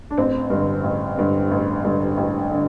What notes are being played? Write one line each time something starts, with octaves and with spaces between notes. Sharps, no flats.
D4
A1 C4
G2 D3
A1
G2 D3
A1
G2 D3
A1
D3